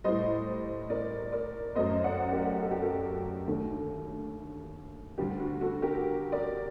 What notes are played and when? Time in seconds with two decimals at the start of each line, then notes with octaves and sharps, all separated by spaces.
0.04 A2 G3 C5 D#5
0.90 A#4 D5
1.32 A#4 D5
1.75 F#2 F#3 A3 C5 D#5
2.04 D5 F#5
2.32 G4 A#4
2.61 A4
2.71 G4
2.81 F#4 A4
3.47 D#2 D3 A3
5.18 D2 D3 G3 G4
5.40 F#4
5.61 F#4 A4
5.82 G4 A#4
6.32 A#4 D5